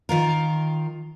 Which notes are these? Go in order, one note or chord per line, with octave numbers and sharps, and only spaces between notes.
D#3 F4 A#4